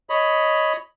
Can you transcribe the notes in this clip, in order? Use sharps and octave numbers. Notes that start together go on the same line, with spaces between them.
C#5 D#5 B5